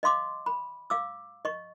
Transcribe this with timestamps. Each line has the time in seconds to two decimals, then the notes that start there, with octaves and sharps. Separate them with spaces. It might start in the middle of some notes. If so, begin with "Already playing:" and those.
0.03 D#5 F5 C6 D6
0.46 B5
0.90 F5 D6 E6
1.45 D#5 C#6